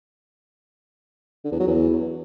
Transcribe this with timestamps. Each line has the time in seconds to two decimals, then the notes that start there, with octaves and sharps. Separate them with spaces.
1.44 D3
1.52 E2
1.60 F#3
1.68 E2